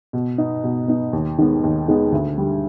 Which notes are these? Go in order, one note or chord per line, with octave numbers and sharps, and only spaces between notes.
B2
B3 D#4
B2
B3 D#4
D#2
D#3 G#3 B3 D#4
D#2
D#3 G#3 B3 D#4
D2
D3 G3